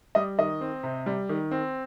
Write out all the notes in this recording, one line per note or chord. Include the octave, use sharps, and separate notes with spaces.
G3 D#5
D#3 D#5
C4
C3
G3
D#3
C4